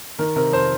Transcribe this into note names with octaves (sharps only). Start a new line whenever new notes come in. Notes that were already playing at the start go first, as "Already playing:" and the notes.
D#3 A#4
C3 A#4
F2 C5